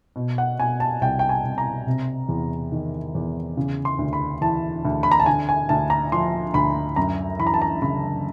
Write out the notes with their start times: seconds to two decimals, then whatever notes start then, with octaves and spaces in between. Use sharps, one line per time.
0.16 B2
0.38 F#5
0.59 B2 G#5
0.80 A5
1.01 C2 G5
1.19 G5
1.29 G#5
1.43 C2
1.58 A#5
1.87 C3
2.29 E2
2.72 D#3
3.15 E2
3.57 C#3
3.85 C6
3.99 D2
4.13 B5
4.41 E3 A5
4.85 D2
5.03 B5
5.12 A#5
5.20 A5
5.26 D3 G#5
5.49 G#5
5.69 D2 A5
5.90 A#5
6.12 F3 C6
6.54 D2 B5
6.96 F#2 A#5
7.39 E3 B5
7.47 A#5
7.54 A5
7.62 A#5
7.82 C#3 B5